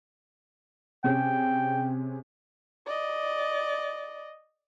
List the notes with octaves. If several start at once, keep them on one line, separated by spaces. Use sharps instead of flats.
C3 C#4 G#4 G5
D5 D#5